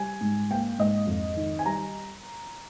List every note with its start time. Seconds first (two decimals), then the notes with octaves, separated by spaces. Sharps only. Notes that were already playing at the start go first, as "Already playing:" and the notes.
Already playing: G3 G#5
0.21 G#2
0.50 A#3 G5
0.79 G#2 D#5
1.07 F2
1.37 D#3
1.59 G#5
1.65 G3 A#5